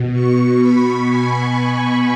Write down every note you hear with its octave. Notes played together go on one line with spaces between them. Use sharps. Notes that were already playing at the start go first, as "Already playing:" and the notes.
Already playing: B2
C#6
B5
G#5